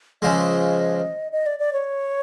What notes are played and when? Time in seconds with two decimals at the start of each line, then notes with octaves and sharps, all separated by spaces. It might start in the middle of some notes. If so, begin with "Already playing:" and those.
0.22 C#2 C#3 F3 G#3 D#5
1.32 D#5
1.46 D5
1.59 D5
1.73 C#5